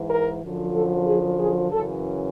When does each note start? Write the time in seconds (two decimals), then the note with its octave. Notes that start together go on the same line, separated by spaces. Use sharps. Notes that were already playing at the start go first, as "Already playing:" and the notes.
Already playing: G#2 E3
0.10 A#4
0.43 F#2 D3 F3
0.75 A4
1.07 G#4
1.39 G#4
1.72 F#2 C#3 E3 A4